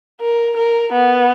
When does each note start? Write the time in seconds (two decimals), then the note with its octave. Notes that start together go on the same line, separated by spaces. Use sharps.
0.21 A#4
0.57 A#4
0.93 B3